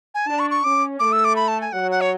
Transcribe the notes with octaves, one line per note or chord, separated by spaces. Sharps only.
G#5
D4 A5
C#6
C#6
C#4 D6
A3 D6
E6
D6
B5
A5
G#5
F#3 F#5
F#5
C#5